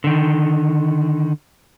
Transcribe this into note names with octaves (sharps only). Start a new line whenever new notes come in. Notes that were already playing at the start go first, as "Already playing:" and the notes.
D3 D#3